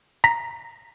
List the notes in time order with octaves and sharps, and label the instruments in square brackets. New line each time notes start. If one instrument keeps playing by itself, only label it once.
[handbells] A#5 A#6 B6